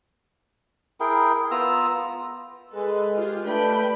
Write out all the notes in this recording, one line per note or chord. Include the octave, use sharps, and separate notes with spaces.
E4 G#4 A#4 G5
B3 F4 A#5 E6
F4
G#3 A4 B4
F4 G4 G#4
A3 D4 B4 G5 B5